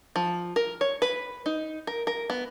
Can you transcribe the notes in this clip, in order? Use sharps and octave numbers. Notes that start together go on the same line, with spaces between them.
F3
A#4
C#5
B4
D#4
A#4
A#4
B3